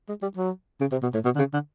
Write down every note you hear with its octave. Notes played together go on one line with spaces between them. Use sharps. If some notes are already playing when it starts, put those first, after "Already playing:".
G#3
G3
F#3
C#3
C3
B2
A2
B2
D3
C#3
D3